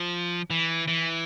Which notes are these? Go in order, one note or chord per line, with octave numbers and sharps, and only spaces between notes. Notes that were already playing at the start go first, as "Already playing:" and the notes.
Already playing: F3
E3
E3